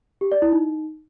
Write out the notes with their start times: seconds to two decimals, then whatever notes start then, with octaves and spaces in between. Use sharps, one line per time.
0.21 G4
0.32 D5
0.42 E4
0.52 D#4